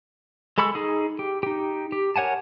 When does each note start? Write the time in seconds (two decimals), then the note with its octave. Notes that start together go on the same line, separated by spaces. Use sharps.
0.58 G#3 A4 B5 C#6 E6
0.75 D#4 G#4
1.19 G4
1.43 D#4 G4
1.92 G4
2.16 A#4 C#5 F#5 G#5 A5